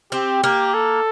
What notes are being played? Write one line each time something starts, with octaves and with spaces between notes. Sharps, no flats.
C4 G4
A#3 G4
A4